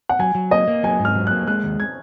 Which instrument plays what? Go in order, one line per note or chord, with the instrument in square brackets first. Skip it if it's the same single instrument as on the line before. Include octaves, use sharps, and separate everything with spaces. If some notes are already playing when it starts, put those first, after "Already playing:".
[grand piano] F#5
[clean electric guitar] F#3 [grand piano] G#5
[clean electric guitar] F#3
[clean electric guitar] A#3 [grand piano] D#5
[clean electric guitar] A#3
[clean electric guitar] F#3 [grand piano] G#5
[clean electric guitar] G#2
[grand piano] F6
[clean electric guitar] F#3
[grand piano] F#6
[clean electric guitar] A#3
[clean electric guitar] G#3 [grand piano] F#6
[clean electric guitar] D#2
[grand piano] G#6